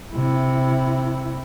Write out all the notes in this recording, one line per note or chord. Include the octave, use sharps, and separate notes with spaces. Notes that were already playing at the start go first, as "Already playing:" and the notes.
C3 E4